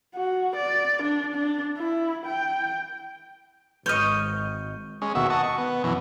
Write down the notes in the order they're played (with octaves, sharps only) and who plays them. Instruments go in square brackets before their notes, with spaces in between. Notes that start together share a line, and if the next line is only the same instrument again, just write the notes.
[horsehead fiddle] F#4
D5
D4
D4
E4
G5
[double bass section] G#1 [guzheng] C#5 D#5 [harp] C#6 F6 G6
[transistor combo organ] G#3 C#4
D#2 B2 F#4 E5
D#5 F#5 A5 C#6
C#6
B3
F#2 B2 E3